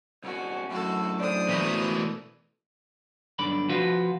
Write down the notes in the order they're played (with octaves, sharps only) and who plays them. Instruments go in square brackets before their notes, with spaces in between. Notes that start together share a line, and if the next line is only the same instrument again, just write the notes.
[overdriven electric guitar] C2 C#4 [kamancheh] F#4
[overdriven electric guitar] F#2 A2 [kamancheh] F#4 A4
[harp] D4 A4 D5 [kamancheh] C5 D#6
[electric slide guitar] B2 E3 A3 [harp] A#4 B5 B6
[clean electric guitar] B1 G2 D3 D5 B5
C3 F3 F4 F#4 B4